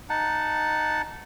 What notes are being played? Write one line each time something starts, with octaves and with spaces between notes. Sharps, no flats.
D#4 F#5 A5